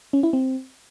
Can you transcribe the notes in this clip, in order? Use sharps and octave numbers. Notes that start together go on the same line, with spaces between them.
C#4
E4
C4